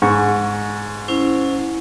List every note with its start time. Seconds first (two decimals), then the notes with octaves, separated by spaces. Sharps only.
0.02 G#2 C#6
1.08 C#4 E4 C5